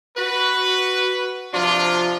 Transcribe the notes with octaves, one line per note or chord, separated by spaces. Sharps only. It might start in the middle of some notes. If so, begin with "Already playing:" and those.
F#4 B4
C3 F3 D4 F4